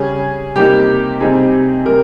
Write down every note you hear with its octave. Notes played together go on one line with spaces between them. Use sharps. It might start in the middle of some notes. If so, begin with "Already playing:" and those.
Already playing: C#3 G3 C#4 G#4
C3 G3 A#3 D#4 G4
C3 G3 C4 D#4 G#4
C3 G3 A#4